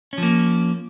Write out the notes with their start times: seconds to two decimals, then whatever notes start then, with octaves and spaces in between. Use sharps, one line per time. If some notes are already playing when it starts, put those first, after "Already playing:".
0.13 C#4
0.18 F3
0.23 A#3